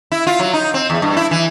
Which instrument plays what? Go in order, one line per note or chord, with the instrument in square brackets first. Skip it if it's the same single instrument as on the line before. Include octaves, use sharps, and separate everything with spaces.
[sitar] E4
F4
F#3
D#4
C4
E2
G2
E4
E3